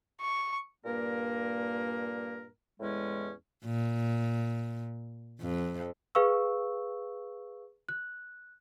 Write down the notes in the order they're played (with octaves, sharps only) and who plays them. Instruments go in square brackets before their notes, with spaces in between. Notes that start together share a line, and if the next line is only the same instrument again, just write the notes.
[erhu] C#6
[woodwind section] G2 A#2 A#3 A#4
E2 A2 G#3 C#4
[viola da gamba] A#2
F2
[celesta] G#4 B4 F5 C#6 E6
F#6